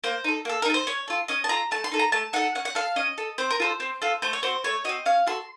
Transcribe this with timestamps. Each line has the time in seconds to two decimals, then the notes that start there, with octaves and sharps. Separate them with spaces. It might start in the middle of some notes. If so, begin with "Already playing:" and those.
0.04 A#3 C5
0.24 D#4 A4
0.45 A#3 A4
0.62 A#4
0.65 D#4 A4
0.74 C5
0.87 C#4 C#5
1.08 F4 A4
1.28 C#4 D#5
1.44 A5
1.49 F4 A4 A#5
1.71 A3 A5
1.84 C6
1.92 D#4 A4
1.99 A#5
2.12 A3 A5
2.33 D#4 A4 F#5
2.55 C#4 F#5
2.65 F#5
2.75 A4 F5
2.96 C#4 D#5
3.18 A4
3.38 C4 C5
3.51 A#4
3.60 F4 A4 C5
3.80 C4
4.02 F4 A4
4.22 A3 C5
4.33 C#5
4.43 C4 F#4 C5
4.64 A3 C#5
4.85 C4 F#4 D#5
5.06 C#4 F5
5.27 F#4 A4 C6